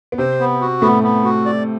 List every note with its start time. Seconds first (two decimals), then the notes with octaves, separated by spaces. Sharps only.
0.12 B3
0.18 C3 C4 C5
0.40 B3
0.61 F#4
0.82 A2 A3 B3
1.03 B3
1.25 F#4
1.46 D5